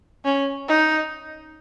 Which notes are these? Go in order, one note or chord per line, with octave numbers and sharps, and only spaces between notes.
C#4
D#4